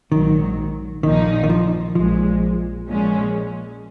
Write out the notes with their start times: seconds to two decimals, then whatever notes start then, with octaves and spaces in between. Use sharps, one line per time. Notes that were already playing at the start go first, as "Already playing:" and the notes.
0.12 A#1 G#2 D#3 F#3
1.03 A#1 A#2 D#3 F3 A#3 D#4
1.43 D#3
1.50 F3
1.95 A#1 A#2 F3 G#3
2.88 A#2 F3 G#3 C#4